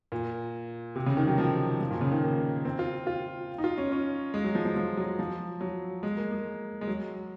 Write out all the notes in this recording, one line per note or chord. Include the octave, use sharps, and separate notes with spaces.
A#2
C3
C#3
D#3
F#3
F3
F3
A#2
C#3
D#3
A#3
C4
F4
F4
D#4
F4
C#4
C#4
G#3
F#3
F3
F3
F3
F#3
F3
F#3
G#3
A#3
G#3
G#3
F#3